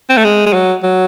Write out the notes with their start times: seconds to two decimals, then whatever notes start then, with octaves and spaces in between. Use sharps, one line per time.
0.09 C4
0.17 A3
0.24 G#3
0.46 G#3
0.53 F#3
0.83 F#3